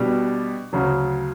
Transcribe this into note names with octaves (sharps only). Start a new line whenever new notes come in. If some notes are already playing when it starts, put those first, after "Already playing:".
Already playing: B2 G3 D4 G4
D2 C#3 F#3